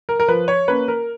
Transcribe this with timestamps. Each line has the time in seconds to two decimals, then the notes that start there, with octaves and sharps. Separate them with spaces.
0.09 A#4
0.20 A#4
0.28 F3 B4
0.48 C#5
0.68 A#3 C#4 B4
0.88 A#4